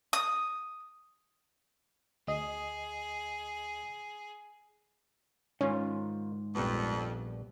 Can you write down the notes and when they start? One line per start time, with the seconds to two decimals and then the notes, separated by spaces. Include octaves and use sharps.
0.13 D#6
2.28 D2 G#4 D#5
5.61 G#2 D#3 C#4 F4
6.55 A#1 F2 G3 B3